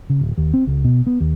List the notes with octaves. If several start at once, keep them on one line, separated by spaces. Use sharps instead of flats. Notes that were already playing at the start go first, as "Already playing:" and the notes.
C#3
D1
D#2
C4
C#2
B2
B3
D#2